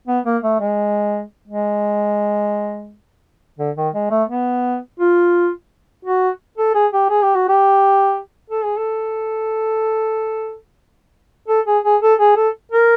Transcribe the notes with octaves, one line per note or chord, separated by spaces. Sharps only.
B3
A#3
A3
G#3
G#3
D3
D#3
G#3
A3
B3
F4
F#4
A4
G#4
G4
G#4
G4
F#4
G4
A4
G#4
A4
A4
G#4
G#4
A4
G#4
A4
A#4